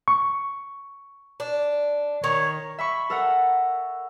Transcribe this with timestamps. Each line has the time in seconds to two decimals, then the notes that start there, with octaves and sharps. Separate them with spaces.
0.08 C#6
1.40 D4
2.24 D#3 C#5
2.78 E5 B5 C#6
3.10 A4 A#4 F#5